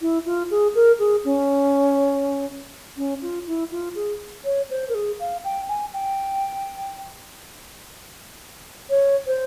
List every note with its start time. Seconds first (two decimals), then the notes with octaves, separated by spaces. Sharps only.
0.01 E4
0.26 F4
0.51 G#4
0.75 A#4
0.99 G#4
1.25 C#4
2.97 C#4
3.22 F4
3.47 E4
3.72 F4
3.95 G#4
4.45 C#5
4.71 C5
4.89 A#4
4.95 G#4
5.20 F5
5.44 G5
5.69 G#5
5.93 G5
8.90 C#5
9.27 C5